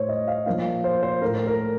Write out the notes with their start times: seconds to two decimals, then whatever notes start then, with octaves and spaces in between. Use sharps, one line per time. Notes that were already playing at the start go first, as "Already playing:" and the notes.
Already playing: A2 A3 C5 C#5
0.09 D#5
0.28 F5
0.46 A#2 F3 A#3 F5
0.84 C5
1.03 C5
1.21 A2 A3 A#4
1.47 A#4